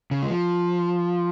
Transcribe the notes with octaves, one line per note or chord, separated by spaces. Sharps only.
C#3
G#3
F3